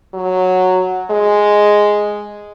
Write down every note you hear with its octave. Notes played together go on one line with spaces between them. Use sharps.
F#3
G#3